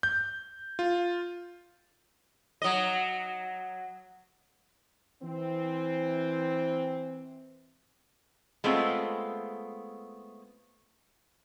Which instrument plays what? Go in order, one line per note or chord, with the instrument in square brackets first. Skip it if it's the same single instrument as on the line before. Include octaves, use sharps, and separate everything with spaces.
[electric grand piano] G6
F4
[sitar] F#3 D#5
[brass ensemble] E3 C4
[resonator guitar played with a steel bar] G#3 A3 B3 C4 F4